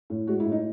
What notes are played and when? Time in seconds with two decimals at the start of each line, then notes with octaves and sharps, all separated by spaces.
0.10 A2
0.27 G#3 F#4
0.40 E4
0.46 A2
0.52 D#4